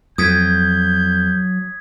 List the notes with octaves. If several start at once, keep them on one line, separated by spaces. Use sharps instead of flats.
F2 F#3 D#6 G6 G#6 B6